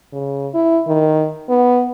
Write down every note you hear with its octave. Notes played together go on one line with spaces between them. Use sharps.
C#3
E4
D#3
B3